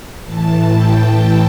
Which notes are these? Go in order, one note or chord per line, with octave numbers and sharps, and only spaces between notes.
A2 E3 A5
G5